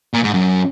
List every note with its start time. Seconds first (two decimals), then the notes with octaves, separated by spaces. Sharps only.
0.14 A#2
0.24 G#2
0.34 F#2